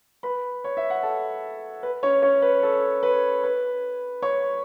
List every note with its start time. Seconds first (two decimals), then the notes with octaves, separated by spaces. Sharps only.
0.23 B4 B5
0.64 C#5
0.77 E5
0.90 F#5
1.03 A4 A5
1.83 B4
2.03 C#4 C#5
2.22 C#4 C#5
2.42 B4
2.63 A4
3.03 B4
3.43 B4
4.22 C#5 C#6